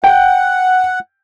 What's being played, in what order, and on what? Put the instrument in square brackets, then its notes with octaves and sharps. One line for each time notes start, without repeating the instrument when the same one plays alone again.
[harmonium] F#5 [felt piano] G5